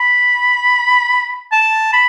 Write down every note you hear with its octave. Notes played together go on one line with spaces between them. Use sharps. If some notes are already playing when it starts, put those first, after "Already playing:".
Already playing: B5
A5
B5